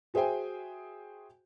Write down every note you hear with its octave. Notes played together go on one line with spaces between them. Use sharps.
F#4 G#4 C5 E5 G5 G#5